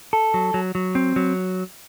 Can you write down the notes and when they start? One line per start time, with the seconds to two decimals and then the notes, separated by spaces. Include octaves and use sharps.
0.13 A4
0.34 F#3
0.54 F#3
0.75 F#3
0.95 C4
1.16 F#3